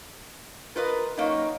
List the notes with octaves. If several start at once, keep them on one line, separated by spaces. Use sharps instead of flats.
F4 A#4 B4 D#5
F#2 A#3 D#4 C#5